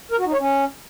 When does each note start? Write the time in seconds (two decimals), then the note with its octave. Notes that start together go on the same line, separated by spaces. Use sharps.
0.11 A#4
0.18 F#4
0.25 D#4
0.33 C#5
0.40 C#4